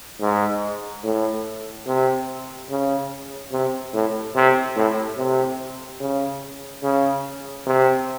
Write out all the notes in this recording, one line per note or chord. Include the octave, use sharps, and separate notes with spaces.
G#2
A2
C3
C#3
C3
A2
C3
A2
C3
C#3
C#3
C3